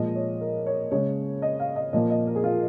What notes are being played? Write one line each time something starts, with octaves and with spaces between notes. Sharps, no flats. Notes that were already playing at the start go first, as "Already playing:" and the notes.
Already playing: A#2 F3 G#3 D#5
C#5
A#4
C#5
C#3 G#3 C#5
D#5
F5
D#5
A#2 F3 A#3 D#5
D#5
A#4
G#4
F4